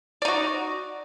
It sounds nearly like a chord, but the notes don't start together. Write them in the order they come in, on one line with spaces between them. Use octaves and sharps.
D5 D#4 F#4